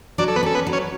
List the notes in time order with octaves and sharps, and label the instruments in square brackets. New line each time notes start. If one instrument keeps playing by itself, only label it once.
[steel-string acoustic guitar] F#3 [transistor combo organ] D4 D5
[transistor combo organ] A4
B3 B4
[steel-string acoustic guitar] C#4 [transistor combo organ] A4
[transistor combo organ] B3 B4
[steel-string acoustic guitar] F#3
[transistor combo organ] C#4 C#5